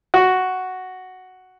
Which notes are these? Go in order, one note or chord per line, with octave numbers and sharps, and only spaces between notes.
F#4